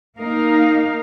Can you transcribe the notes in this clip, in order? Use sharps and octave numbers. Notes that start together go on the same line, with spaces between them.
A#3 D#4 A#4 F5